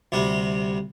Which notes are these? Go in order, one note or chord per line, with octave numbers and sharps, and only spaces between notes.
D2 C3 G3